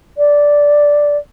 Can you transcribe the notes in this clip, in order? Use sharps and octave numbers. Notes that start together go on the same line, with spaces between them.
D5